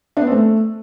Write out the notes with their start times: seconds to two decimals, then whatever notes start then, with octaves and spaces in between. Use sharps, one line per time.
0.17 D4
0.22 B3
0.27 C4
0.32 A3